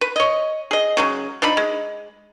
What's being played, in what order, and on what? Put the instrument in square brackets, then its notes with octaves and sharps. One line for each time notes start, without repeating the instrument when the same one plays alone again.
[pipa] B4
C#5 D#5
G#4 D#5
C#3 F#3 G#3
F3 D4 D#4 B5
G#3